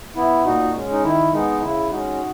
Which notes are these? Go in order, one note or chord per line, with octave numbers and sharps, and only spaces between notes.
B3 E4
A#2 D#4 F#4
G#3 C#4
D#4
D#3 E4
G#3 B3 D#4
C#3 E4
G#3 C#4 D#4 F#4